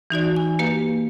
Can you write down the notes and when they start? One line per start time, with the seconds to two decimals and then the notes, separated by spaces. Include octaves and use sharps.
0.10 E3 D#4 F#4 D5
0.36 G#5
0.59 A#3 G4 B4 F5